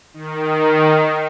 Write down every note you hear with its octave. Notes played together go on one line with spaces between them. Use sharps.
D#3